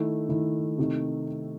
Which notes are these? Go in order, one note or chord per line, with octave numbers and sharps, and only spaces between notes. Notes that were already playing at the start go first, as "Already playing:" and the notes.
Already playing: D#3 A3 E4
D#3 A3 E4
C3 D#3 A3